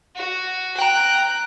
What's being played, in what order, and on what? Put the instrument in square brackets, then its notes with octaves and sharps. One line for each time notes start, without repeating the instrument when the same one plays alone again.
[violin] F#4
[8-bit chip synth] G5 A#5 [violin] F#6 D7